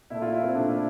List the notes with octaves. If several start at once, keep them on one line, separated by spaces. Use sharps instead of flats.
A#2 A3 E4
F4
E4
C4
A#2 A3 D4
E4